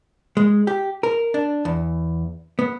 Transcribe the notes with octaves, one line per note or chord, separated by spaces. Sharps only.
G#3
G4
A#4
D4
E2
B3